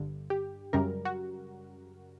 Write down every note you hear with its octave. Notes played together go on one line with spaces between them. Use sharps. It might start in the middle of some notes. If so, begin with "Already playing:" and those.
Already playing: G1 G2 D3
G4
F#2 C#3 G3 A#4
F#4